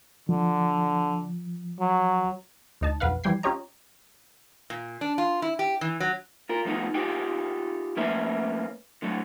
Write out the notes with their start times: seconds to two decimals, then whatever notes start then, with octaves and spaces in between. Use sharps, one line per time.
0.29 D3 F3
1.80 F#3
2.81 D2 D#4 A5
3.00 B1 F2 B4 F5 F#5
3.24 E3 F3 G3 G5 G#6 C7
3.43 C#4 F4 G4 C#5 D#5 A#5
4.70 A#2
5.01 D4
5.18 F4
5.42 E4
5.59 G4
5.81 E3
6.00 F#3
6.49 F4 A#4
6.65 F3 A3 B3 C4 D#4
6.94 D#4 F4 G4 G#4
7.97 F3 A3 A#3 C#4 B4 E5
9.02 D3 F#3 A3